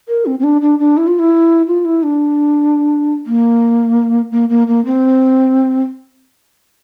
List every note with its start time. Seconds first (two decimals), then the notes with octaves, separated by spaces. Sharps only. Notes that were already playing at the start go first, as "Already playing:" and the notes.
0.08 A#4
0.26 C4
0.39 C4
0.44 D4
0.62 D4
0.79 D4
0.97 E4
1.07 F4
1.19 E4
1.67 F4
1.85 E4
2.03 D4
3.27 A#3
4.32 A#3
4.49 A#3
4.68 A#3
4.85 C4